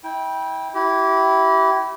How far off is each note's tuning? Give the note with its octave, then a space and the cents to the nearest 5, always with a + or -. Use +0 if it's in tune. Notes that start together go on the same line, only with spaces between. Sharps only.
E4 -30 G5 +0
E4 +0 G4 -30